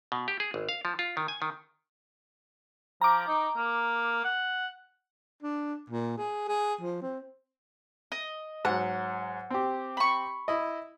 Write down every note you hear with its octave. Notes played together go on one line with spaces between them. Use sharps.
B2
G4
G#4
G#1
F5
F3
F4
D#3
G#5
D#3
F3 A#5 D6
D#4
A#3
F#5
D4
A#2
G#4
G#4
F3
C4
D#5
G#2 F#3 F#5
C4 G4
B5 C#6
E4 D#5